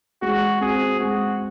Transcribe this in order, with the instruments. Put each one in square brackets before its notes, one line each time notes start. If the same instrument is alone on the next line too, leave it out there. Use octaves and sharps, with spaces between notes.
[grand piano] G#3 [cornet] F#4
[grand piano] C4 F#4 [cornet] G#4
[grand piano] G#3 [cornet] F#4